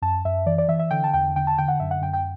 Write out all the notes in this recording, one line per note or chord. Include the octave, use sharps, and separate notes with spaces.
F#2 A5
F#2 E5
E3 D5
D5
E3 E5
E5
D3 G5
A5
E2 G5
D3 G5
A5
D3 G5
F#5
F#2 E5
F#5
F#2 G5
G5